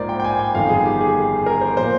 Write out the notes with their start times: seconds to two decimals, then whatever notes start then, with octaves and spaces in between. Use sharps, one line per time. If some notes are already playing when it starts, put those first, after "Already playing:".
Already playing: A#1 G#2 F3 A#4 C5 D5
0.09 G5
0.20 G5
0.24 G#5
0.39 G5
0.55 G1 F2 D#3 F5
0.69 G#4
0.85 G4
1.01 G#4
1.46 A#4
1.61 C5
1.77 A#2 F3 C5